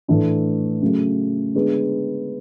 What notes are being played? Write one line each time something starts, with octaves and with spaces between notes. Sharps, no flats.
A2 E3 A3 D4
C#3 F#3 A3
D3 G#3 B3